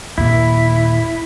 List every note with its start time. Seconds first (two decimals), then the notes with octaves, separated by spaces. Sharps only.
0.18 D#2 A#2 A#3 E4